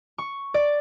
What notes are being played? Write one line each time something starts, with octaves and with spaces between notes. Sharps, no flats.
C#6
D5